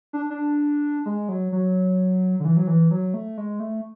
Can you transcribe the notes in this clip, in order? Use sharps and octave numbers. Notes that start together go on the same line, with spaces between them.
D4
D4
G#3
F#3
F#3
D3
E3
F#3
E3
F#3
A3
G#3
A3